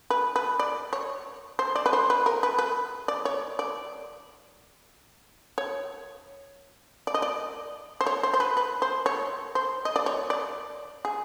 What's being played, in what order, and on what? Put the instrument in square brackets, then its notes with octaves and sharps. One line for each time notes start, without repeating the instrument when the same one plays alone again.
[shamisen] B4
B4
D5
C#5
C5
D5
B4
C5
B4
A#4
B4
B4
D5
C#5
D5
C#5
D5
D#5
D5
C5
C#5
C5
C5
B4
B4
C5
C#5
C5
D#5
D5
C#5
D5
G#4